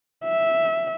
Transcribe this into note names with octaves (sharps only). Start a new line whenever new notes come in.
E5